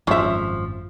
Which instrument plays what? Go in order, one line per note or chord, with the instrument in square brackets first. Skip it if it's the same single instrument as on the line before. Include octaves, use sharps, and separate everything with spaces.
[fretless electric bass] G#1 F#2 G#3 [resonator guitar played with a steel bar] F3 [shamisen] C#4 E5